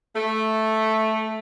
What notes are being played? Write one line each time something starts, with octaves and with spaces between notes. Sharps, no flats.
A3